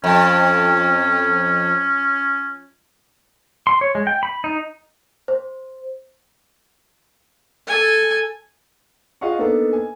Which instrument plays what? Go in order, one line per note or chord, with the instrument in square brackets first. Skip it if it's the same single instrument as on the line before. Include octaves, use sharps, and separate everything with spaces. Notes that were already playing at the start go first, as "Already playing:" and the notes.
[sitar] F2 [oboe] C#4
[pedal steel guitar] C6
C#5
G#3
G5
B5
D#4
[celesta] C5
[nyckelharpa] A4 G#5
[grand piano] F4 G#4 D#5 F5 F#5 C#6
A#3 B3 D4 D#4 A4
G#5